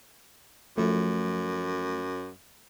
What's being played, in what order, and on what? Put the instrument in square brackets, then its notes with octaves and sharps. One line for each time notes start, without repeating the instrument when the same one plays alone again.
[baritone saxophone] F#2 [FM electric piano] F3 A3